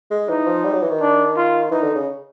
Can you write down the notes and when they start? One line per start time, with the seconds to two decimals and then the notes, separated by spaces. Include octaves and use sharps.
0.11 G#3
0.29 E3 D#4
0.47 F3
0.64 G3
0.74 F#3
0.83 E3
0.91 D#3
1.00 D4
1.37 F4
1.72 E3 D#4
1.83 D3
1.95 C#3